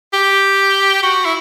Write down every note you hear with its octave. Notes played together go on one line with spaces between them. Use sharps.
G4
F#4
E4